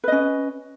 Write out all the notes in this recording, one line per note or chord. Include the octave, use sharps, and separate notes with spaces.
C#4 B4 D#5